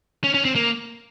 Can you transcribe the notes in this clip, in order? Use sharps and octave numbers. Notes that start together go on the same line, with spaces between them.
C#4
C#4
C4
A#3